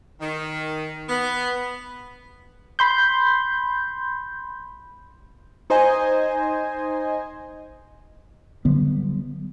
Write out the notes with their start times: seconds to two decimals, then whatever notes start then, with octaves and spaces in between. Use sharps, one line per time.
0.21 D#3
1.09 B3
2.79 B5 C6 G6
5.70 D#4 C5 D#5 G#5
8.65 D3 F#3 G3 B3